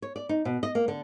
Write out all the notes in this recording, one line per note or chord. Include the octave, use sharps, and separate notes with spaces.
C#5
D5
D#4
B2
D#5
A#3
D3